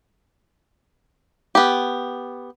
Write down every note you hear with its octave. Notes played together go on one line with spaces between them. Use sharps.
B3 G4